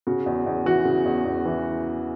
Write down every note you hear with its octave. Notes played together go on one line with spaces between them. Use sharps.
C#3 F#4
E2
E2
E3 F#4
C#3
E2
E2
E3